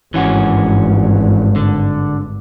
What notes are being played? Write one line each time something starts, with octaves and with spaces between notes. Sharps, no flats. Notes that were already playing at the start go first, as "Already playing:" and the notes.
G#1 G2 E3 C#4 F#4
D3